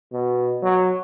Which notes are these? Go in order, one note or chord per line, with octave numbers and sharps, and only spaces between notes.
B2
F#3